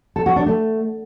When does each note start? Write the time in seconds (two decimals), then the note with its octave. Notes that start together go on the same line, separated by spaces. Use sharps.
0.16 A4
0.26 F#4
0.36 D4
0.46 A3